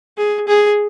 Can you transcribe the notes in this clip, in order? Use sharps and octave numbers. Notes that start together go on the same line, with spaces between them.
G#4
G#4